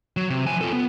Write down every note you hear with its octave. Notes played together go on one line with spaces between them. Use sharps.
F#3
C3
F3 G#5
F4 A4
B3